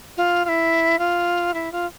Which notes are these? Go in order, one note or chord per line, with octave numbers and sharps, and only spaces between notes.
F4
F4
E4
F4
E4
F4